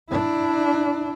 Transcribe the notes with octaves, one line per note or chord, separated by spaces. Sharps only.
D4 E4